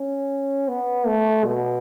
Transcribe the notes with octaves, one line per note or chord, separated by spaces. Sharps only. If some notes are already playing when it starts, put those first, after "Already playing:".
Already playing: C#4
B3
A3
B2